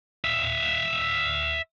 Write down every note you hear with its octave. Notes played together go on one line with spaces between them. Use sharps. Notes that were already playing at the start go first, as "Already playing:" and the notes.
E5 F5